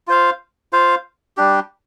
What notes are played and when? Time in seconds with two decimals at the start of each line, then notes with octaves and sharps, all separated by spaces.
0.07 F4 C5 F5
0.73 F4 C5 F5
1.37 G3 D4 G4